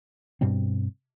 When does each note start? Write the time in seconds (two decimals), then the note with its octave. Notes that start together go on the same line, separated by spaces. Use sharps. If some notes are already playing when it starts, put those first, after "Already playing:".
0.41 G2 B2 G3 C4